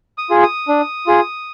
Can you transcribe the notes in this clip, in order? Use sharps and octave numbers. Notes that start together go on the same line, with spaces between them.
D#6
F4 G#4
D#6
D4
F4 G#4